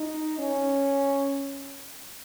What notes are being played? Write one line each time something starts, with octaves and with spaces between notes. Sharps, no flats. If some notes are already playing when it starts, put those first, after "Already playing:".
Already playing: D#4
C#4